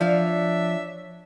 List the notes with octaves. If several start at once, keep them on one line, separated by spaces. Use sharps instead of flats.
F3 D4 C#5 D5 E5 F5